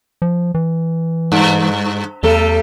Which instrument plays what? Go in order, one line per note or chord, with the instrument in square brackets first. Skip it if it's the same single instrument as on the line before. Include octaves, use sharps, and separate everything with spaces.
[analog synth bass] F3
E3
[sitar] G2
[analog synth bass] E2 [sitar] G3 A3 A4